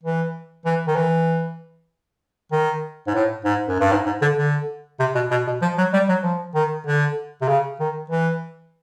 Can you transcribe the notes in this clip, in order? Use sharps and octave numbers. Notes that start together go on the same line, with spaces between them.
E3
E3
D#3
E3
D#3
G#2
A2
G#2
F#2
G2
G#2
G#2
D3
D3
C3
B2
B2
B2
F3
F#3
G3
F#3
F3
D#3
D3
C3
C#3
D#3
E3